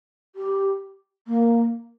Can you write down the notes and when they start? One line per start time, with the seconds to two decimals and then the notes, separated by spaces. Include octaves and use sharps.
0.36 G4
1.27 A#3